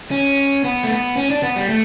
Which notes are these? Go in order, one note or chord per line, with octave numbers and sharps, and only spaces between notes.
C#4
B3
A3
B3
C#4
D4
B3
G3
A3